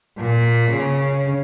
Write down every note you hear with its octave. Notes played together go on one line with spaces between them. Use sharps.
A#2
C#3